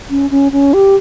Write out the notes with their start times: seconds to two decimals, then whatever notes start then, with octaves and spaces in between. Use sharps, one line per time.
0.10 C#4
0.31 C#4
0.52 C#4
0.74 G4